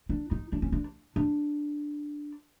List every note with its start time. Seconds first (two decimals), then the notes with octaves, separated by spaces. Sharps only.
0.09 D4
0.31 D#4
0.52 D4
0.62 C#4
0.72 D4
1.16 D4